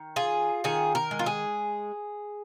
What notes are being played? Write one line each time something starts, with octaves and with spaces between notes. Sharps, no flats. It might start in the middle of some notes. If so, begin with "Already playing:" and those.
Already playing: D#3
F4 G#4
D#3 G#4
A#4
G#3
F4
G#4